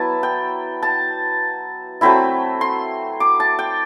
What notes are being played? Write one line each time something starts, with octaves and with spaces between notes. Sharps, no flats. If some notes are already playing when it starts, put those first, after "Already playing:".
Already playing: F#3 B3 E4 A5
G5
A5
F#3 A3 C4 E4 B5
C6
D6
A5
G5